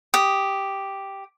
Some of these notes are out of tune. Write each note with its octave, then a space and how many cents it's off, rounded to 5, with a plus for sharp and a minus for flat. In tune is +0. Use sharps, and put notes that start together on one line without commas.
G4 +0 D#6 +0